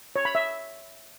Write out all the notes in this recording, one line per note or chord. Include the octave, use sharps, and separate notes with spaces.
C#5
B5
E5